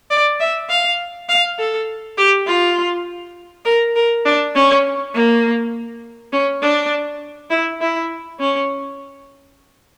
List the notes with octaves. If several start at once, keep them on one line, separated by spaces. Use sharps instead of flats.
D5
E5
F5
F5
A4
G4
F4
A#4
A#4
D4
C#4
A#3
C#4
D4
E4
E4
C#4